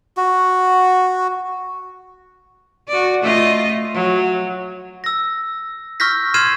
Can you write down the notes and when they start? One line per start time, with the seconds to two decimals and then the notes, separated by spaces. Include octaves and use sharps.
0.17 F#4
2.88 F#4 D5
3.22 A3 F4 D#5
3.94 F#3
5.04 E6 A#6
6.00 C#6 E6 F6 G6 A#6 B6
6.34 C6 F6 G#6 C7 D#7 E7